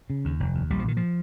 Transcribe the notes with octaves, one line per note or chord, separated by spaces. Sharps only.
C#3
D#2
F1
D#2
A#1 G3
F3
A#2 D#3
F3